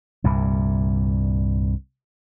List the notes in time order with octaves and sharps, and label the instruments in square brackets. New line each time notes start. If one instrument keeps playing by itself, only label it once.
[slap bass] C2 G2 A#2